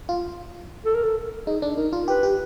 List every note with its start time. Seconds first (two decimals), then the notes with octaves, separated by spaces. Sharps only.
0.09 F4
0.85 A4
0.94 A#4
1.04 A4
1.47 D#4 G#4
1.62 D4
1.77 D#4 A#4
1.93 F4
2.08 G4 B4
2.23 G4